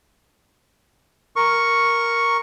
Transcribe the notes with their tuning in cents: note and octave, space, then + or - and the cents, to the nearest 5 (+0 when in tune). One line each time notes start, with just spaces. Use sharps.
A#4 +0 C#6 +0